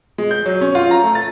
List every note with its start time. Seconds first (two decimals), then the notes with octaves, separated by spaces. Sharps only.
0.18 G#3
0.31 G6
0.46 F#3
0.61 C#4
0.75 F4
0.91 A#5
1.03 A3
1.15 A6